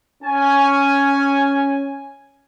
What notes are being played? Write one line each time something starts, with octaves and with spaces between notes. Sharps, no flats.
C#4 G#5